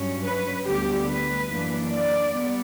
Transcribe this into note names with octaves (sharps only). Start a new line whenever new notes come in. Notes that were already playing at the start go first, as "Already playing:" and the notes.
Already playing: G2 F#3 C#4
B4
D2 D3 G3 B3 G4
B4
F#2 E3 A#3 D4
D5
G3 B3